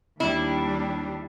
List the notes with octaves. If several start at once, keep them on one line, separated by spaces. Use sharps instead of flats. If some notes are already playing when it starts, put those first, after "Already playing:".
D#2 G3 D4 E4